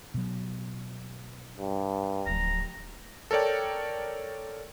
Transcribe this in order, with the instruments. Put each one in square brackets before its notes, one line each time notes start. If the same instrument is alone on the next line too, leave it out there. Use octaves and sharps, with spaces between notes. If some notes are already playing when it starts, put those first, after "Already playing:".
[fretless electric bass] B2 F#3
[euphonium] G2
[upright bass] D1 F3 [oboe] A#5
[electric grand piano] A4 A#4 C#5 D5 G5